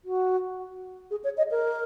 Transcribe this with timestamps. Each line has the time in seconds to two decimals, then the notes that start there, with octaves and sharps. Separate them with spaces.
0.05 F#4
1.11 G#4
1.24 C#5
1.38 D#5
1.51 A#4